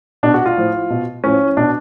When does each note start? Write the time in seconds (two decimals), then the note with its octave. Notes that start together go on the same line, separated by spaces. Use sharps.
0.23 B2 D4
0.34 F#4
0.46 F4
0.57 A2 F3
0.90 B2
1.24 A2 F3 C#4
1.57 B2 D4